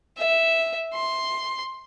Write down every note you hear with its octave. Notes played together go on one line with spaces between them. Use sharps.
E5
C6